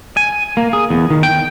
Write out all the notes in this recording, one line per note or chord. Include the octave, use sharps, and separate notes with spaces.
G#5
A#3
G#4
E2
D#3
G5